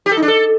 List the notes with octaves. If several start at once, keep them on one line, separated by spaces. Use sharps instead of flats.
G4
A4
D#4
D4
A4